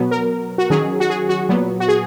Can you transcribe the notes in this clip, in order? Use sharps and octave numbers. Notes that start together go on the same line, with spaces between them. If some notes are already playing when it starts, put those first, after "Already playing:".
Already playing: B2 F#3 B3
A#4
F#4
D#3 F#3 C#4 G#4
F#4
G#4
F#4
A#2 F#3 B3
F#4
G#4